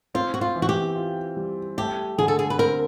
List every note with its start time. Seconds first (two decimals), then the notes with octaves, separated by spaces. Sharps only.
0.15 C4 F4
0.34 F#4
0.41 F4
0.55 E3
0.62 F#4
0.69 G4
0.96 F4
1.37 G3
1.77 A3 G4
2.18 D3 G#4
2.28 A4
2.39 G#4
2.50 B4
2.59 C4 A#4